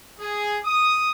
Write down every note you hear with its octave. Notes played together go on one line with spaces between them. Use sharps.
G#4
D#6